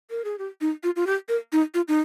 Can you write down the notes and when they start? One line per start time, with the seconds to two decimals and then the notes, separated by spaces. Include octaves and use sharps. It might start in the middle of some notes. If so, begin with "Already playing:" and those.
0.10 A#4
0.24 G#4
0.38 G4
0.61 D#4
0.84 F4
0.96 F4
1.07 G4
1.29 A#4
1.53 D#4
1.74 F4
1.88 D#4